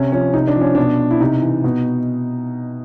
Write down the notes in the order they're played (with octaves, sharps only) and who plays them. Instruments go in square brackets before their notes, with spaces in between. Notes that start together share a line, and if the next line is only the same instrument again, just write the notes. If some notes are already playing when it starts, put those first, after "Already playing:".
Already playing: [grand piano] C3 C#4
F3 C#4
C3 D#4
D4
F3
C#4
B2 D4
E4
C3 D#4
E3
B2